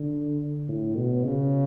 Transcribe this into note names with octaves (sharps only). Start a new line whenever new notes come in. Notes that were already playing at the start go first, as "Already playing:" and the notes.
Already playing: D3
A2
B2
C#3